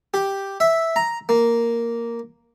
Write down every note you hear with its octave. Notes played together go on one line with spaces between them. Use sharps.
G4
E5
A#5
A#3